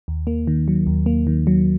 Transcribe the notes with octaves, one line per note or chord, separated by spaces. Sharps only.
D#2
A#3
D#3
F#3
D#2
A#3
D#3
F#3